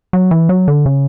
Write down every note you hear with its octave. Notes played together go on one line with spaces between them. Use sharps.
F#3
E3
F#3
D3
C#3